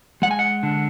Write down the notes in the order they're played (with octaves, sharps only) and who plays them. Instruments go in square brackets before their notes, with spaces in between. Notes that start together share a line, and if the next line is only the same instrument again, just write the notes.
[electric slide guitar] G#3 F#5
G#5
F#5
D3